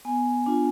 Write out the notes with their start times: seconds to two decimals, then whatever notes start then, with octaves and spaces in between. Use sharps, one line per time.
0.05 B3 G#5
0.46 D4 F4